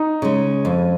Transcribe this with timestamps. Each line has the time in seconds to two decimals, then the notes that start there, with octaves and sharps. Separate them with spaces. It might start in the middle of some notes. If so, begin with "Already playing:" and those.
Already playing: D#4
0.22 C#3 G#3
0.65 F2